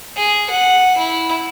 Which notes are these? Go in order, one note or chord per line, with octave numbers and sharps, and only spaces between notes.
G#4
F#5
E4